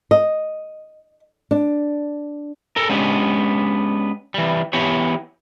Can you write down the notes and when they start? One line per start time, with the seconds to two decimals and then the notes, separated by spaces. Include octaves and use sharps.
0.11 D#5
1.51 D4
2.76 A4 A#4
2.89 G#3 B3 C#4 D4 G4
4.34 E3 G3
4.73 E3 B3 G4 C#5